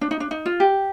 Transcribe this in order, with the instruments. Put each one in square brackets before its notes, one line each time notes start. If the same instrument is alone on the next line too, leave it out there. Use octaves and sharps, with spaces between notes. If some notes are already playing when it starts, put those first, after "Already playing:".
[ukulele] D4
D#4
D4
D#4
F4
G4